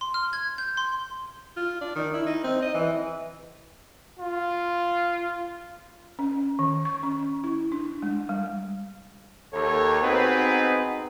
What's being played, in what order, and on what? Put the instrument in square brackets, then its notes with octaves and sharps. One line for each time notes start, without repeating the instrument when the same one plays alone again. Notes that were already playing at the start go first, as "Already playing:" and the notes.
[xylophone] C6
F6
G#6
G6
C6
[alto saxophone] F4
D4
D#3
E4
D#4
C4
D#5
E3
[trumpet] F4
[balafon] C#4
D#3
C#6
C#4
E4
D4
G#3
G3
[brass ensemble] D#2 A4 C#5
B3 C4 D#4 F#4 G#4 B4